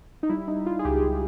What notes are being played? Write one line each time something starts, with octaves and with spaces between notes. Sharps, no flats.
D#4
G3 E4
D#4
G3
F4
G#4
C#2 G4